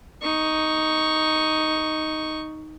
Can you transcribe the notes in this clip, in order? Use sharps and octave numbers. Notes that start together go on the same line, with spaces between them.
D#4 C#6